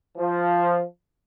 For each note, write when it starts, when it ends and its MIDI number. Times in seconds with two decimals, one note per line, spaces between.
0.18 0.82 53